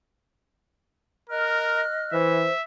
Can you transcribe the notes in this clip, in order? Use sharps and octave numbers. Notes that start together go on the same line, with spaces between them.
A#4 D#5 F6 F#6
E3 C5 E5